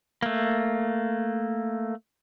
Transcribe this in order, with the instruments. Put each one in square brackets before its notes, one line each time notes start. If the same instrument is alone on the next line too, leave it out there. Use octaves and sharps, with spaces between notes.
[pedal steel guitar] A3 A#3